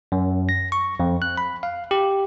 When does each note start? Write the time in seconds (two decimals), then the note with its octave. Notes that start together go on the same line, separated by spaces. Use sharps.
0.12 F#2
0.49 A#6
0.72 C#6
1.00 F2
1.22 F#6
1.38 B5
1.63 F5
1.91 G4